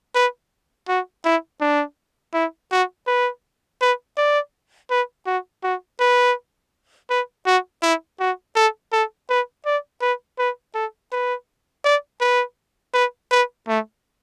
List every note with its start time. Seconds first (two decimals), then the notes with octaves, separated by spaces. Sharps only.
0.15 B4
0.88 F#4
1.25 E4
1.61 D4
2.34 E4
2.71 F#4
3.07 B4
3.81 B4
4.17 D5
4.90 B4
5.26 F#4
5.63 F#4
6.00 B4
7.10 B4
7.46 F#4
7.83 E4
8.20 F#4
8.56 A4
8.92 A4
9.29 B4
9.66 D5
10.01 B4
10.38 B4
10.74 A4
11.12 B4
11.85 D5
12.21 B4
12.94 B4
13.31 B4
13.68 A3